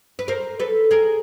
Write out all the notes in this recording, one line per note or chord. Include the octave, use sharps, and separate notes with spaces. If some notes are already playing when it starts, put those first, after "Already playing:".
B4
A#4 C5
A4 B4
G#4 A#4